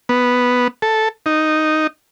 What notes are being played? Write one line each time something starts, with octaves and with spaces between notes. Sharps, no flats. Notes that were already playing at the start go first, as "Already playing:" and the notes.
B3
A4
D#4